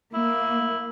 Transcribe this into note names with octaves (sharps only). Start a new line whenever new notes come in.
A#3 E4